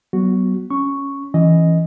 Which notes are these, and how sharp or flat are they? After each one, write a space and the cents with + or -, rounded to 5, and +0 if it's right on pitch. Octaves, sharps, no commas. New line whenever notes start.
F#3 +35 B3 +0 F#4 +0
C#4 +0 C#6 +0
E3 +0 C#4 -15 D#5 +0